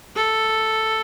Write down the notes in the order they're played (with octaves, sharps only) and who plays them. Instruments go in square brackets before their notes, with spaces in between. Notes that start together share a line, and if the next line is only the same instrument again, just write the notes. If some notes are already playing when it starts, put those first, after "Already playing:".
[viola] A4